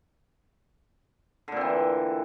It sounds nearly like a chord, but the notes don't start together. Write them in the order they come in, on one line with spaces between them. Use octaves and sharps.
D3 A#2 C4 E3